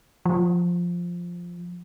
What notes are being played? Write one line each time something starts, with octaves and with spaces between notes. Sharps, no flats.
F3